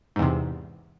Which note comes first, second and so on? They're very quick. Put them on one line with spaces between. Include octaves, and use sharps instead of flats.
G#2 E2 C3